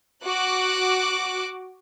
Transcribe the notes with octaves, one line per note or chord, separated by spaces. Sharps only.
F#4 D6 F#6